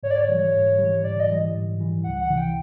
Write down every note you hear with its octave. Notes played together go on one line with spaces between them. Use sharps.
G#2 C#5
D5
C#5
E3 G3
G#2
E3 G3
G#2 D5
D#5
E3 G3
G#2
E3 G3
C#2 F#5
F#5
C3 E3
G5